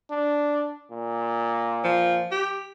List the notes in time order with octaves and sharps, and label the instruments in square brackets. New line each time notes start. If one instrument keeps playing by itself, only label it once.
[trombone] D4
A#2
[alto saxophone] F3
G4